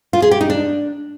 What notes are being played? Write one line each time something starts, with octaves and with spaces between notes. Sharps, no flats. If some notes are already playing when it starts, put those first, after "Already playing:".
F4
G#4
G4
D#4
D4